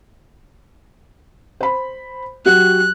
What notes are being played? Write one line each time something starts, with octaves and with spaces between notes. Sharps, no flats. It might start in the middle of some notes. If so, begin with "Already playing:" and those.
C5 B5
F#3 F#4 G4 F#6